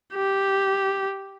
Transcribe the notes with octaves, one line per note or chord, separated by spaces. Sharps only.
G4